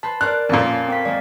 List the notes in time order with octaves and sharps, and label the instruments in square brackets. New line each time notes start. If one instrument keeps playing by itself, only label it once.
[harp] B4 C5 [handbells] A5
[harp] A#4 C5 D5 [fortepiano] F#6
[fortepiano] F2 A#2 [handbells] C#4 F5
[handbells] C4 F5 B6
[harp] G#3 A#3 [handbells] D5